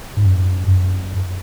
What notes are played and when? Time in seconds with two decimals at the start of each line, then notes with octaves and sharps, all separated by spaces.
0.17 G#2
0.25 F#2
0.68 F#2